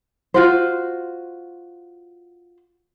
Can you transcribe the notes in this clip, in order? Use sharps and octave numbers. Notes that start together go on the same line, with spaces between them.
F4 F#4 C5